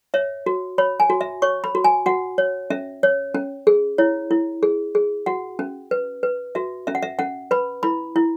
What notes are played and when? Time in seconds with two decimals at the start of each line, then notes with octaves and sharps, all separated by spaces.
0.14 C#5 E5
0.46 F#4
0.78 C#5 B5
1.00 G#5
1.10 F#4
1.21 E5
1.42 C#5 C#6
1.64 B5
1.75 F#4
1.84 G#5
2.06 F#4 F#5
2.38 C#5
2.70 C#4 E5
3.03 C#5
3.35 C#4
3.67 G#4
3.98 E4 C#5
4.31 E4
4.63 G#4
4.95 G#4
5.26 F#4 F#5
5.59 C#4
5.91 B4
6.23 B4
6.55 F#4 E5
6.87 C#4 E5
6.95 F#5
7.02 E5
7.19 C#4 F#5
7.51 B4 B5
7.83 E4 B5
8.16 E4